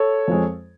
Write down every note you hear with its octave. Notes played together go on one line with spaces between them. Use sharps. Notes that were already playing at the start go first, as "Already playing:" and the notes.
Already playing: A4 C#5
F2 F3 G#3